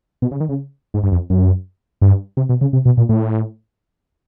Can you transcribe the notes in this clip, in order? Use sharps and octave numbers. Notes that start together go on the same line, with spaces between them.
B2
C#3
D#3
C#3
G#2
G2
F2
F#2
G2
C3
B2
C#3
C3
B2
A#2
A2